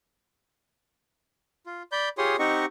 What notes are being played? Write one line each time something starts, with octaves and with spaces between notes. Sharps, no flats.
F4
D5 B5 G6
F4 G4 G#4 C#5 C6 D#6
C4 D#4 G4 D#5 F#5 C#6